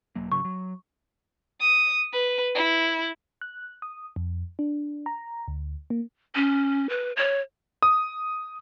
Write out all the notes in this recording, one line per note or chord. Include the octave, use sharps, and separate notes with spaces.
E1 F#3 A#3
G#1 C#3 F#3 C#6
F#3
D#6
B4
E4
F#6
D#6
F2
D4
A#5
D2
A#3
C#4
B4
C#5
D#6